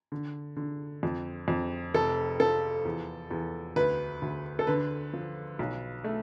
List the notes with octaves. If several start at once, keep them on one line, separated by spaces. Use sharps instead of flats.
D3
D3
F2
F2
F1 A4
F3 A4
E2
E2
D2 B4
D2
A4
D3 B4
F3
B1
A3